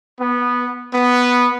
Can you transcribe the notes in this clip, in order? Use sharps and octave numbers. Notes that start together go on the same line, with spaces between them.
B3
B3